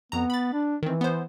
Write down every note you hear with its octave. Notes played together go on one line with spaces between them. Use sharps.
F2 B3 A#5
B5 A6
D4
D#3 E3 C4
B3 C5